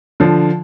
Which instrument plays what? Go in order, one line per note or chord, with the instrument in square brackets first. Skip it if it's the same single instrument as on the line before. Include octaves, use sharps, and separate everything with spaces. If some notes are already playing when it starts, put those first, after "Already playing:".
[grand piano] D3 F3